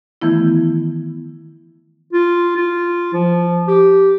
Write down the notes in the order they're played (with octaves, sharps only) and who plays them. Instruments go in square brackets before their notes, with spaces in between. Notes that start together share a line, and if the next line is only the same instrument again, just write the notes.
[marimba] D#3 E3 A3 B3 E4
[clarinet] F4
F4
F3
G4